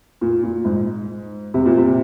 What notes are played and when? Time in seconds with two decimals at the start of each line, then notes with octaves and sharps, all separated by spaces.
0.21 A#2
0.44 A#2
0.65 G#2
1.54 C3
1.66 A#2
1.78 C3